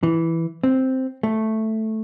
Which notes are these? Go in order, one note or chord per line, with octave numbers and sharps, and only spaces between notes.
E3
C4
A3